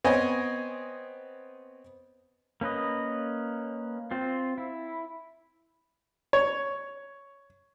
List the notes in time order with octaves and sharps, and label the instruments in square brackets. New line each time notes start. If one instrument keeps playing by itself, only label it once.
[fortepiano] B3 C4 C#5 D#5 G#5
[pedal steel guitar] A#3 C#4 B4 D#5
C4 F4
E4
[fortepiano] C#5